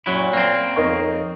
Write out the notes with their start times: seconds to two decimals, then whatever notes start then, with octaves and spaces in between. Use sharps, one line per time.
0.06 F#2 A#2 F#3 E4
0.33 A#3 C4
0.76 F2 D#4 A#4 C#5 D#5